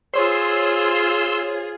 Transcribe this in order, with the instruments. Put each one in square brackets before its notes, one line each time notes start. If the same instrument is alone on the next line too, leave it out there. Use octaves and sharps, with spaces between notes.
[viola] F4 G#4 [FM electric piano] C5 C#5 [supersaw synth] C6 E6